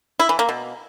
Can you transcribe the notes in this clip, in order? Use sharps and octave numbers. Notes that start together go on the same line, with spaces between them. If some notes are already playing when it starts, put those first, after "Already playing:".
E4
E3
A#3
B2